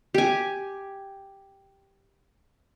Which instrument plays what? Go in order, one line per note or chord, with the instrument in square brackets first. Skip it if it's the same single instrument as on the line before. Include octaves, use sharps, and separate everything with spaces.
[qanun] G4 G#5